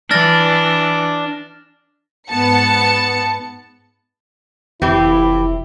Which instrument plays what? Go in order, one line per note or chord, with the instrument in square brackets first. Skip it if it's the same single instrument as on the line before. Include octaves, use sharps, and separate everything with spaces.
[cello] E3 [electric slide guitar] D4 [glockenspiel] F6 A6 A#6
[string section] G#2 B3 A5 C#7
[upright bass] F1 [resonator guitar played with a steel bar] E3 C4 G4 [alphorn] E4